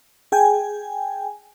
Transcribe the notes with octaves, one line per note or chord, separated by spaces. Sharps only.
G#4 G5 G#5